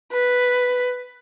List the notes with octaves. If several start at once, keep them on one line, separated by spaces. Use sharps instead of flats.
B4